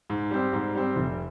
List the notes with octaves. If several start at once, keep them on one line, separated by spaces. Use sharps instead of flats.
G#2
G3 C4
G#2
G3 C4
F1